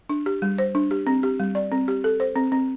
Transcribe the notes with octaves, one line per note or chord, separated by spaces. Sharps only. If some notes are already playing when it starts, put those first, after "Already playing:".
D4
G4
G3
C5
D4
G4
C4
G4
G3
D5
C4
G4
A4
C5
C4
C4